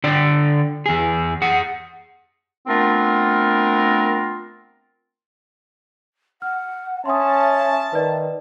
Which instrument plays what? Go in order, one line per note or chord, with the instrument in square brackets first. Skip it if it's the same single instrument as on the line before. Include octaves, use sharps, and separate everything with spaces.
[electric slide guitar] D3 D5 G5
E2 G#4
G#4 F#5
[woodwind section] A3 B3 C4 D4 F4 A#4
[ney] F#5 [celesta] F6
[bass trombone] C#4 [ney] E5 [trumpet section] A5 [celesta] C6 D#6
[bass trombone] D#3 [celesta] B4 D5